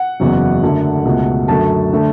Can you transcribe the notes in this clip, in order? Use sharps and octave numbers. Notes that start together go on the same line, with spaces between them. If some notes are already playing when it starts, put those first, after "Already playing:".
Already playing: F#5
F#1 E2 C#3 F#3
F#2 D3 A3
C#2 B2 A3
F#2 D3 F#3 A3 A5
D3 A3